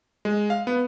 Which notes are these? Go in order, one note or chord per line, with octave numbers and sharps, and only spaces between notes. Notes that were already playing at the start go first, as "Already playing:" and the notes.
G#3
F5
B3